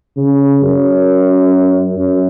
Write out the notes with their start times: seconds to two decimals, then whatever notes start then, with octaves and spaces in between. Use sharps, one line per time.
0.17 C#3
0.62 F#2
1.96 F#2